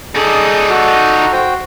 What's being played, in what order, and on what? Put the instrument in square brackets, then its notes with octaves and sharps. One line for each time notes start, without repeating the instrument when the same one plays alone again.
[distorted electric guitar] D#4 D5 [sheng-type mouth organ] G#4 A4 D#6
[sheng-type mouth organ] F#4 A4
F#4 C5 G5